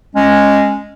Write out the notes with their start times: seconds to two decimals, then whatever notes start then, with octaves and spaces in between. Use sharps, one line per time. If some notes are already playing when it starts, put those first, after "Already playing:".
0.15 G#3 C#4